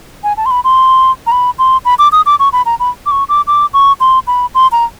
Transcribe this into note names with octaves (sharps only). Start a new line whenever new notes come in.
G#5
A5
C6
B5
C6
A#5
B5
C6
B5
D6
D#6
D6
C#6
B5
A#5
B5
D6
C#6
D6
D6
C#6
C6
B5
C6
A#5